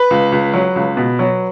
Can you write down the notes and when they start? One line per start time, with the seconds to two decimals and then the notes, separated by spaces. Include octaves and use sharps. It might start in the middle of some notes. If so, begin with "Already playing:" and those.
Already playing: B4
0.10 C#2
0.32 C#2
0.54 F#3
0.76 C#2
0.97 B2
1.19 F#3